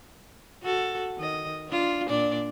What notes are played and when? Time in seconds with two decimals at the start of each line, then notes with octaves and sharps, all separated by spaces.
0.63 F#4 A4
1.17 D#3 D#5
1.69 D4 F4
2.08 A#2 D4 D5